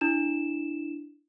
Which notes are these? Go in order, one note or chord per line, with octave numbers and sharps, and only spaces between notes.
D4 E4 E7